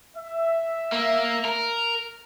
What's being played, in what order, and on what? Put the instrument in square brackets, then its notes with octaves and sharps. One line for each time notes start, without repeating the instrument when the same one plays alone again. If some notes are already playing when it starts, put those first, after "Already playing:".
[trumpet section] E5
[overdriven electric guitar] A#3
A#4